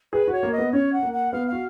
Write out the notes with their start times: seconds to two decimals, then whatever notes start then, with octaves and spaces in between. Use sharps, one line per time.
0.13 G#4 B4
0.28 F#4 C#5
0.43 A#3
0.52 D#5
0.58 B3
0.72 C#4 C#5
0.93 F#5
1.03 A#3
1.13 F#5
1.32 B3 F5
1.48 F#4 F5